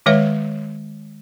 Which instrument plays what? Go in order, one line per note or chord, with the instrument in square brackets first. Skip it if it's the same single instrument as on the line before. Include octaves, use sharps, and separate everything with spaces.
[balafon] D#3 G#3 B4 C#5 E5